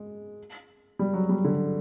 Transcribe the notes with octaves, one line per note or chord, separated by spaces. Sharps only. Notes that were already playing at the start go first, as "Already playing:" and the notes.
Already playing: G#3
G3
F#3
G3
D3